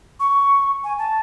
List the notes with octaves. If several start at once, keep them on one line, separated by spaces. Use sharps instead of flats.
C#6
G#5
A5